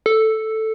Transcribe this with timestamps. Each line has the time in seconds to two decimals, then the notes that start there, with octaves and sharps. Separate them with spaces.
0.06 A4